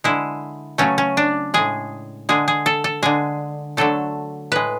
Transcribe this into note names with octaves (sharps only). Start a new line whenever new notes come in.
D3 G#3 E4
C#3 F#3 A3 C#4
C#4
D4
A2 G#3 G#4
D3 G#3 G#4
G#4
A4
A4
D3 G#3 G#4
D3 F#3 A3 A4
A2 G#3 B4